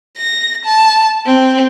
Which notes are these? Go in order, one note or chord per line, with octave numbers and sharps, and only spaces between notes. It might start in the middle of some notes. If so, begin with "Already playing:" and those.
A#6
A5
C4